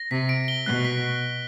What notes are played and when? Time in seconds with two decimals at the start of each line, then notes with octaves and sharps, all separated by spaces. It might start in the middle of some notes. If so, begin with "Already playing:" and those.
Already playing: A#6
0.10 C3 B6
0.29 D7
0.48 G7
0.66 B2 F#6
0.85 B6